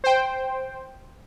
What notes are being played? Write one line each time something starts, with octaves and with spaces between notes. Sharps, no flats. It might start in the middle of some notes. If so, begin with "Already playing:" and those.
C5 G5